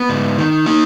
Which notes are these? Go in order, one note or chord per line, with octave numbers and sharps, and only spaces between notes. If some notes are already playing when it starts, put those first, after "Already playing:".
Already playing: B3
G#2
D#3
A#3 D#4